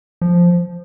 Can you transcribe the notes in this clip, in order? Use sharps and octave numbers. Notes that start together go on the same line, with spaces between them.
F3